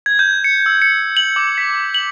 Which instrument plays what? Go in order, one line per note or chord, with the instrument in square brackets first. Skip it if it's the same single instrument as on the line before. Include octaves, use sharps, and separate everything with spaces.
[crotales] G#6
G6
C#7
E6
C#7
F#7
D6
B6
F#7